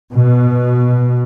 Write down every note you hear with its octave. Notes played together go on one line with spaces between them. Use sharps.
B2